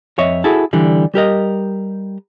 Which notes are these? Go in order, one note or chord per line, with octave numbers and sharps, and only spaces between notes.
F2 C#5 D#5 E5
E4 F#4 G#4 A4
D3 E3 G3
G3 G4 A#4 D#5